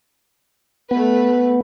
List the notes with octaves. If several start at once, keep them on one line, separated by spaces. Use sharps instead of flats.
A3 B3 B4